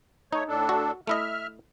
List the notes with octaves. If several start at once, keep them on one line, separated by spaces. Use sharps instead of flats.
A3 D#4 C#5
A2 D4 A4
F#4
A3 E4 D#5 E5 F6